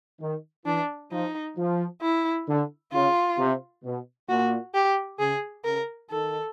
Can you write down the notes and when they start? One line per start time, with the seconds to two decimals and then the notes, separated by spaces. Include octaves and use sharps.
0.20 D#3
0.65 E3 D4
1.11 F3 D#4
1.57 F3
2.02 E4
2.48 D3
2.92 C#3 F4
3.38 C3
3.84 B2
4.29 A#2 F#4
4.74 G4
5.19 C#3 G#4
5.65 C#3 A#4
6.10 D#3 A4